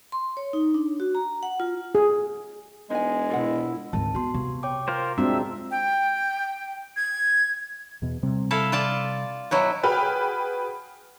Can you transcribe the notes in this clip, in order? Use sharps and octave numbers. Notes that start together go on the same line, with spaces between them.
C6
C#5
D#4
D4
F#4
A#5
F#5
F4
G#4
E1 G#3 D#4 G#5
B2 E4 F4 A#4 F#5
G#1 D2 A5
B3 F#4 C6
C3 B3
C#5 G5 D6
F4 A#4 C5
G#3 C4 D4 F4 F#4 E5 A#5
G5
G#6
E2 B2
C3 G3 C4
E4 A4 F5
F4 D5 A5
B2 F#3 E4
F#4 G#4 B4 G5 B5 F6